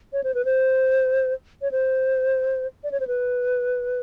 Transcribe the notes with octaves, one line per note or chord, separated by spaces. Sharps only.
C#5
C5
B4
C5
C#5
C5
D5
C#5
C5
B4